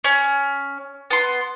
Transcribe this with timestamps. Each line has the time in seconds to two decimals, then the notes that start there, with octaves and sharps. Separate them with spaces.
0.04 C#4
1.11 B3 C6